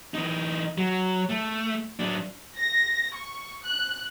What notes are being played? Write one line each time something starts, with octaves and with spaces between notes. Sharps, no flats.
E3 D#4
F#3
A3
F#3 D4
A#6
C#6
F#6